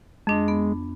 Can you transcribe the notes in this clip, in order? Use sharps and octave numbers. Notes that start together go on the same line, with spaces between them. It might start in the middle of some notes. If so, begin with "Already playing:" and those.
F2 G#3 D4
B3